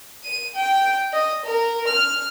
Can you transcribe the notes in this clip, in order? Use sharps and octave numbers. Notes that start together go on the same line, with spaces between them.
D#7
G5
D#5
A#4
F6